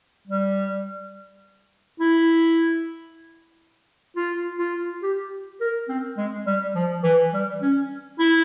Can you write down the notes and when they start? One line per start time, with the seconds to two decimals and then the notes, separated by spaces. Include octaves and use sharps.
0.27 G3
2.00 E4
4.17 F4
4.59 F4
5.02 G4
5.61 A#4
5.88 C4
6.17 G#3
6.46 G3
6.75 F3
7.03 E3
7.33 G3
7.62 C#4
8.19 E4